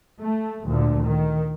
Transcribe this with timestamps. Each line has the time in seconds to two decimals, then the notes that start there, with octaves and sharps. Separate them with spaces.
0.21 A3
0.66 D2 A#2 D3
1.02 D#3